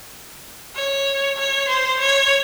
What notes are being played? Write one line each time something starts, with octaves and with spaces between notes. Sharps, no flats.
C#5
C#5
C5
C#5